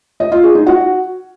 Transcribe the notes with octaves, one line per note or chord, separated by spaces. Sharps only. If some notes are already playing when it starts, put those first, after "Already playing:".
D#5
F4
G#4
D#4
F#4